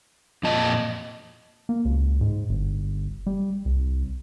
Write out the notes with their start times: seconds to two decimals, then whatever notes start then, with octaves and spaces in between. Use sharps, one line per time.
0.43 F2 A#2 D#5 A5
1.69 A#3
1.85 C#2
2.21 G#2
2.49 G1
3.26 G3
3.65 C2